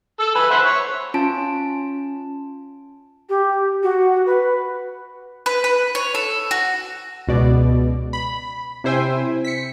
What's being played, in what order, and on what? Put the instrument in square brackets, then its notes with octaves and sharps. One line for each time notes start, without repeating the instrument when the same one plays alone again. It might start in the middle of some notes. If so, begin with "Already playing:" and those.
[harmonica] A4 E6
B4 G#5
C5 E5 F#5
C#5
[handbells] C#4 F4 A5 D7
[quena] G4
F#4
B4
[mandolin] B4
B4
C#5
A4
F#4
[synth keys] C#2 B2 D5
B5
C3 E4 C5 E5 G5 G#5
B6 C#7